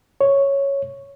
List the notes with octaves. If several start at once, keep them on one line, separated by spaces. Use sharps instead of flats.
C#5